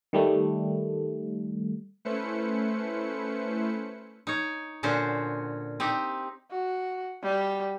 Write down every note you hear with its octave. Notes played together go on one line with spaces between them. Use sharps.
D#3 G3 A3
A3 C#4 E4 B4 C5 C#7
D#4 C#5
A#2 D3 C#4 F#4 C5
C4 D#4 G4
F#4
G3